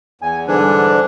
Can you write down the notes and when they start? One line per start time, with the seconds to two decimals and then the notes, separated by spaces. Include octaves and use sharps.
0.22 E2 G#5
0.47 G#2 D3 E3 G3 D4